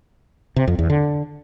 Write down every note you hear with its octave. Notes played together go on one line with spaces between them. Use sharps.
C3
F2
E2
D3